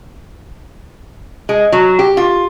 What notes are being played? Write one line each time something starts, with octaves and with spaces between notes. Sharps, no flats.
G#3
F#3
G4
F4